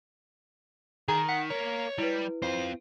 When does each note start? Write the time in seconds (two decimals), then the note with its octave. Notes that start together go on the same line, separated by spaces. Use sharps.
1.08 D#3 G#4 A#5
1.29 F#5 B6
1.50 A#3 A#4 C#5
1.98 G3 E4 B4
2.42 C4 F4 C5